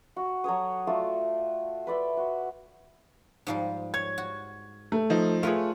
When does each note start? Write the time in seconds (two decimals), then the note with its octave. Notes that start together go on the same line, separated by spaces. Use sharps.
0.16 F#4
0.44 F#3 A4 C#5 D#6
0.87 A3 F4 F#4 D5
1.87 B4 D5 E5 C6
2.17 F#4
3.47 G#2 F3 G3
3.94 C#5 G#6
4.18 F#4
4.92 A3
5.10 F3 D#4
5.43 A3 F4 G#4 A#4 B4 C#5